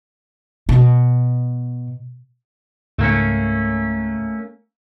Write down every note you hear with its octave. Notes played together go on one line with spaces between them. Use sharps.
B2
C#2 G#2 A3 A#3 C#4